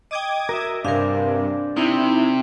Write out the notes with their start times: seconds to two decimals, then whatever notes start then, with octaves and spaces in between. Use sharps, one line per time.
0.11 D#5 G5 D6 D#6 G#6
0.49 F#4 A#4 D#5 E5
0.85 G2 C3 D4 A#4 C5 F5 G#5
1.77 C3 D#4 E4